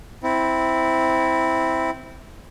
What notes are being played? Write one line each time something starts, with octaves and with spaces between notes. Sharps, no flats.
C4 E4